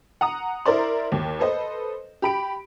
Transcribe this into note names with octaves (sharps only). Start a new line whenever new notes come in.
F#5 A#5 D#6
E4 A#4 C5 D5 C6
D#2
A4 B4 C5 D#5
G4 B5 D7